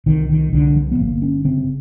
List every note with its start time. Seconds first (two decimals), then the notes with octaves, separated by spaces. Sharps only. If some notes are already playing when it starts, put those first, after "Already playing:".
0.06 C2 D#3
0.29 D#3
0.53 C2 D3
0.75 F3
0.91 B3
0.99 G1 A#3
1.22 C#4
1.45 C#3 C4